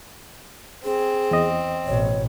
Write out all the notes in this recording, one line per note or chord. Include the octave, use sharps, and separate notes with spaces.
C4 G#4
E2 D#5
A1 B2 C#5